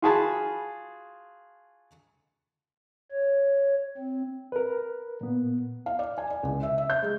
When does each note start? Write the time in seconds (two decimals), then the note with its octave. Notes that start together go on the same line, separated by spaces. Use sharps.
0.02 F4 F#4 G#4 G#5 A5 B5
3.12 C#5
3.97 C4
4.52 A#4 B4
5.21 A#2 B3
5.86 F5
5.99 D5
6.18 G#5
6.30 D5
6.43 C#2
6.63 E5
6.78 E5
6.90 G6
7.02 G#3